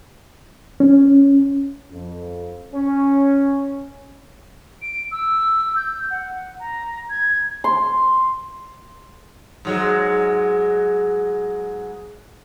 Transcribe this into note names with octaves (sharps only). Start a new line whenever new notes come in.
C#4
F2
C#4
D7
E6
G6
F#5
A#5
G#6
C6
G#2 F#3 G#3